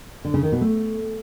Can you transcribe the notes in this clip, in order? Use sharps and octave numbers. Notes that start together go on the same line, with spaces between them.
D3
C#3
D#3
B2
A3